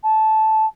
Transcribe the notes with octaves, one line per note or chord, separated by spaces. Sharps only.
A5